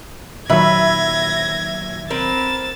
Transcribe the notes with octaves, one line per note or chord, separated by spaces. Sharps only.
A#2 D#3 F#3 B4 E5 G#6 A#6
C4 A#4 B4 A6 E7